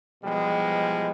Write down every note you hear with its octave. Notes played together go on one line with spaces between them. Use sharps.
B2 E3 F3 G3 G#3